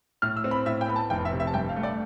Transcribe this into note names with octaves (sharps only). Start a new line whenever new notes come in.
A2 F6
E6
C4
B5
A2 E5
G5
B3 B5
A5
F1 G5
E5
C3
E5
A5
G2 G5
F5
A3
D5